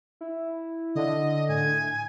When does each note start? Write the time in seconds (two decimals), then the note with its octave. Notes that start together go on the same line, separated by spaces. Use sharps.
0.21 E4
0.95 D3 D#5
1.48 A2 G#5